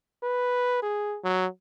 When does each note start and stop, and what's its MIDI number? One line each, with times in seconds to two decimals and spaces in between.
0.23 0.83 71
0.83 1.19 68
1.24 1.47 54